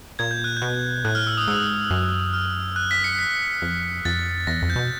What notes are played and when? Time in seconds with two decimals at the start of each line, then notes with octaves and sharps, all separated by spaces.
0.19 A#2 G#6
0.31 G6
0.44 F#6
0.57 B2 G6
1.05 A2 F#6
1.15 F6
1.27 E6
1.37 D#6
1.48 G#2 E6
1.91 F#2
2.34 F6
2.76 F#6
2.91 B6
3.04 C#7
3.19 B6
3.62 F2
4.05 F2 A6
4.47 E2 A#6
4.62 F2
4.70 G6
4.76 B2